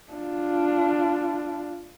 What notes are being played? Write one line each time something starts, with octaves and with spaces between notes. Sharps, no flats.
D4 F4